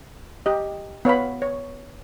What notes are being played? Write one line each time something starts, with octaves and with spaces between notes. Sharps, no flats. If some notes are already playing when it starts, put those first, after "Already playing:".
G4 D#5
B3 C#5 F5 B5
C#5